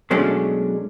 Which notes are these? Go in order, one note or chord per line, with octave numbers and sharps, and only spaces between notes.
B2 F#3 G#3 A3 C#4 D4